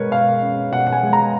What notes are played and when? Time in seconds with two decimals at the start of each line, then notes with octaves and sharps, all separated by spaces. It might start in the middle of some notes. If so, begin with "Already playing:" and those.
Already playing: B2 G#3 A#4 B4 C#5
0.11 B2 F5
0.42 C#4
0.72 B2 F#5
0.87 F#5
0.93 G#5
1.03 G#3
1.13 A#5